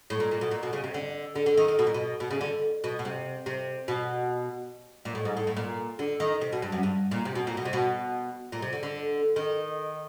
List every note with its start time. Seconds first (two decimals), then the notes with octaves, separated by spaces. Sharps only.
0.10 A2
0.20 A#2
0.31 A#2
0.41 B2
0.51 A#2
0.63 B2
0.73 C#3
0.84 C3
0.94 D3
1.35 D3
1.46 D3
1.57 D#3
1.68 D#3
1.79 B2
1.87 A#2
1.94 B2
2.20 B2
2.31 C#3
2.41 D3
2.84 B2
2.99 B2
3.05 C3
3.46 C3
3.88 B2
5.05 A#2
5.15 A2
5.25 G#2
5.37 A2
5.47 A2
5.56 A#2
5.99 D3
6.20 D#3
6.41 C3
6.52 B2
6.62 G2
6.72 F#2
6.83 G2
7.11 A#2
7.25 C3
7.35 B2
7.47 A#2
7.57 B2
7.65 C3
7.73 B2
8.52 A#2
8.62 C3
8.73 D3
8.83 D3
9.36 D#3